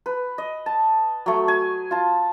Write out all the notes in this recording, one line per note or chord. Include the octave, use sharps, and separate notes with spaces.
B4
D#5
A5
F#3 A3
G#5
F4 A5